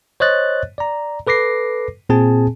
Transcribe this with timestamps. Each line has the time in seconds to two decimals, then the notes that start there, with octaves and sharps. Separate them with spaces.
0.20 C5 C#5 D#5 F#6 A6
0.78 D5 A#5
1.27 A4 B4 D6 A#6 C7
2.09 A#2 C4 G#4 G#5 A5